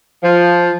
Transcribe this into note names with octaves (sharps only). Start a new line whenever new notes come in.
F3